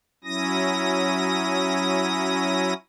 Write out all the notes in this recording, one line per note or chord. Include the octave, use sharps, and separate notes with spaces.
F#3 C#4 E4 D#6 A#6